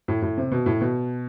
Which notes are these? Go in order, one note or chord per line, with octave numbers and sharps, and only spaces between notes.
A2
A2
C3
B2
A2
B2